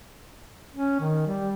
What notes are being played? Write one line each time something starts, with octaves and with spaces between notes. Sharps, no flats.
C#4
D#3
G3